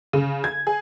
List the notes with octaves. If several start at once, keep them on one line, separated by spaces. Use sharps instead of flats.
C#3
G#6
G#4